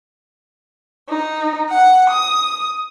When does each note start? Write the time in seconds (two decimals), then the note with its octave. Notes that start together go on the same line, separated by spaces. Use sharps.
1.08 D#4
1.69 F#5
2.08 D#6